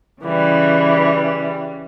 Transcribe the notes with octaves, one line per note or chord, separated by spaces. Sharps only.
C#3 E3 G3